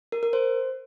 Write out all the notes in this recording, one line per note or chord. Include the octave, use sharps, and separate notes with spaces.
A#4
A#4
C5